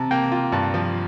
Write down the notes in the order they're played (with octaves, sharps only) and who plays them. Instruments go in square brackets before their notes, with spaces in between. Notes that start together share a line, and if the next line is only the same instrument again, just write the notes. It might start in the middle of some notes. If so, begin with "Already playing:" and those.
Already playing: [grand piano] C3 [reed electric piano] A5 A#5
[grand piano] A#3 [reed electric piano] G5
[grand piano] F4
[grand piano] G2 [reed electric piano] A5
[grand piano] F3